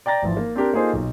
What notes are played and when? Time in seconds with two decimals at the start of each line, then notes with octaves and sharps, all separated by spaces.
0.06 D5 G5 A#5 A6 A#6
0.22 G#1 E3 F3
0.37 A#3
0.55 C4 D4 G4 A#4
0.73 A#3 D#4 F4 G#4 A4 C5
0.93 B1